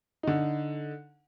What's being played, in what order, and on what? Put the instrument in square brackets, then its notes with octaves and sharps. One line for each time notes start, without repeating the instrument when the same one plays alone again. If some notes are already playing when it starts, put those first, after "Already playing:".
[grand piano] D3 D#4